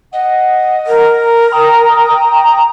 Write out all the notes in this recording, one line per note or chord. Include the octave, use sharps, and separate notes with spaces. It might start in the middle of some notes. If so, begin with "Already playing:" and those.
D#5 F#5
A#4
G5 A#5 D#6